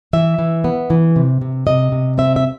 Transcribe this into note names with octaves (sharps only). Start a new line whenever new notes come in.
E3 E5
E3
B3
E3
C3
C3
C3 D#5
C3
C4 E5
E5